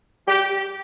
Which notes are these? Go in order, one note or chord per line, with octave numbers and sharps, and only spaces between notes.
G4